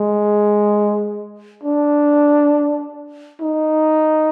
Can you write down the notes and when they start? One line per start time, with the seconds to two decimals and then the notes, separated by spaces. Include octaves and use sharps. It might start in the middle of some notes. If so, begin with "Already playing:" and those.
Already playing: G#3
1.63 D4
3.41 D#4